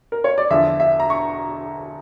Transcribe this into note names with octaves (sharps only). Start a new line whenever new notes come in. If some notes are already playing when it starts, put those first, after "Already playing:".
A#4
C#5
D5
E2 D3 F3 E5
E5
A#5
C#6